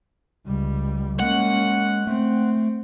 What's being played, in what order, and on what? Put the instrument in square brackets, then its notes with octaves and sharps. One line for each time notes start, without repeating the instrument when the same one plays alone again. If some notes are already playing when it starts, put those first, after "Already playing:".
[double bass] C#2 G3
[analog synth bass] G#3 [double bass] A#3 C#4 [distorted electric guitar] F#5
[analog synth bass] A3 [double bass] C4